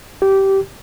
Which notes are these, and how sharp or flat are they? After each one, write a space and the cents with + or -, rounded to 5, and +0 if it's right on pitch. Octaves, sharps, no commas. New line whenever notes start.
G4 -15